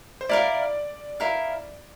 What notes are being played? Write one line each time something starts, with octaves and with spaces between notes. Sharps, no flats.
C5
E4 A#4 D5 F5
E4 A#4 F5